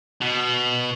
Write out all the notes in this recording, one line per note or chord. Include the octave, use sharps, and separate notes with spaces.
B2